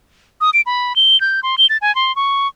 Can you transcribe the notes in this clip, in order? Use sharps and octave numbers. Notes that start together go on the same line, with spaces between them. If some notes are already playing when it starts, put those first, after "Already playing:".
D#6
D7
B5
G7
G6
C6
G7
A6
G#5
C6
C#6